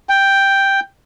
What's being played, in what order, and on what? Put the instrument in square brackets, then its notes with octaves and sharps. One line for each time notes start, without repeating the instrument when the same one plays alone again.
[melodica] G5